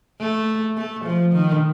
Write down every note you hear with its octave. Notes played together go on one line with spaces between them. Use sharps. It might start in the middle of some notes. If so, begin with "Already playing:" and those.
A3
A3
F3
D#3